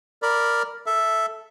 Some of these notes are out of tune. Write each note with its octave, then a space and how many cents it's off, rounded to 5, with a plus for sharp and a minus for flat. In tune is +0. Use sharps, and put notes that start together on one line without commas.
A#4 +0 D5 +0 B5 -10
A4 +0 E5 +0